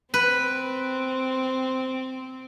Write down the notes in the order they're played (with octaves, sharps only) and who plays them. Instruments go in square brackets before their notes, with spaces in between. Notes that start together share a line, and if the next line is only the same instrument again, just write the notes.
[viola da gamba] C4 [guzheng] B4